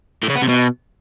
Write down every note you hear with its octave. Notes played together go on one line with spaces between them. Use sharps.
A2
C#3
B3
C3
B2